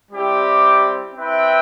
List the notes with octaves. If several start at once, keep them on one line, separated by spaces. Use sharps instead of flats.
G3 C4 E4 G4
C4 E4 B4 E5 G5